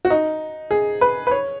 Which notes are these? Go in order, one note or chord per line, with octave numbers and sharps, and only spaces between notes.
F#4
D#4
G#4
B4
B4
C#5